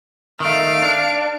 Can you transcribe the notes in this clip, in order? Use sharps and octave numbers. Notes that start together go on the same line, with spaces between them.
D#3 A3 F5 D7
D4